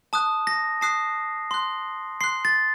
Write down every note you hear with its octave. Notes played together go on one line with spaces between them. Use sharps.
A5 D#6 F#6
A#6
A5 D#6 F#6 C7
C6 F#6
C6 F#6 C7
A6